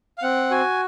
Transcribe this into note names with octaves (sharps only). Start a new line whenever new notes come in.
F5
C4 F#5
F#4 G#5